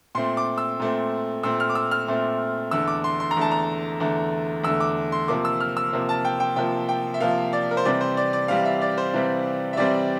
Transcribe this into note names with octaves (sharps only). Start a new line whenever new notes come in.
A#2 A3 C4 C6
D6
E6
A#2 A3 C4
A#2 A3 C4 E6
F6
D6
E6
F6
A#2 A3 C4
E2 D3 A3 E6
D6
C6
C6
A#5
E2 D3 A3 A5
A#5
E2 D3 A3
E2 D3 A3 E6
D6
C6
C3 F3 A#3 D6
E6
F6
E6
C3 F3 A#3
A5
G5
G5
C3 F3 A#3 G5
G5
E5
C3 F3 A#3 F5
D5
A#4
C5
C3 E3 G3 C4 D5
C5
D5
D5
C3 E3 G3 C4 F5
E5
D5
C5
C3 E3 G3 C4
E5
C3 E3 G3 C4 D5